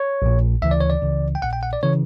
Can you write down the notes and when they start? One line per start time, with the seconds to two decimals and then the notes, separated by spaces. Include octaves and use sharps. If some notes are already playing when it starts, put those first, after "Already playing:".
Already playing: C#5
0.22 A#1 A#2
0.62 D2 C#3 E3 E5
0.71 D5
0.80 C#5
0.90 D5
1.02 C#2 C#3 E3
1.35 G5
1.42 A#1 A#2 F#5
1.53 G5
1.63 F#5
1.73 D5
1.83 C#3 E3 C#5